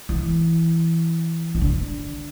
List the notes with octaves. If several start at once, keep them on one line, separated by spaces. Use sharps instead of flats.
E3
E3
D3